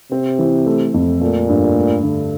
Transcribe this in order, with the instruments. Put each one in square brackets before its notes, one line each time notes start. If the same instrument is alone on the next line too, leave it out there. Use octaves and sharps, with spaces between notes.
[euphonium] C3 [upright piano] C4
[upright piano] E3
A3
F2
[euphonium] A#2 [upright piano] A3
[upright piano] G2
A3
D3